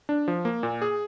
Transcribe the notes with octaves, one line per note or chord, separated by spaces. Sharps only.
D4
F3
A#3
A#2
G#4